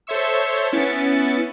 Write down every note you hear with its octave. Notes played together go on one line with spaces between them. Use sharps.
A4 C5 C#5 E5 C#6 E6
B3 C#4 E4 A6 C#7